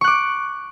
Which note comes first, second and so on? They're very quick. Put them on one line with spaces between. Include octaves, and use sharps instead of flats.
C#6 F#6 D6